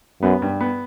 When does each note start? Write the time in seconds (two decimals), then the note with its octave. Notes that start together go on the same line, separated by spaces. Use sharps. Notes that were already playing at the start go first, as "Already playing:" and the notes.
0.23 F#2 B3
0.42 G2
0.61 B3